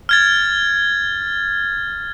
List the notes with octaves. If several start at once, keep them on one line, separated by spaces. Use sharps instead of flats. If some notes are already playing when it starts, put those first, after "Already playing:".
F6 G#6 A6